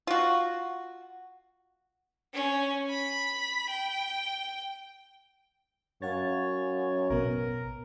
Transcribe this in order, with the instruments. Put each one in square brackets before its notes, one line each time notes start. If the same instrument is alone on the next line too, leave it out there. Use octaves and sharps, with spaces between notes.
[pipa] F4 F#4
[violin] C#4
B5
G5
[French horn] F#2 [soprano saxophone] C#5 [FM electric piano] F5 F#5 A6
[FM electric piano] A1 B2 B3 [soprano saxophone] A#4